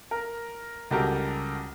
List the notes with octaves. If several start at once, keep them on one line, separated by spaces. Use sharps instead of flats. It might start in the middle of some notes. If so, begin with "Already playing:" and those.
A#4
C#2 G3 F#4 G4 A4 A#4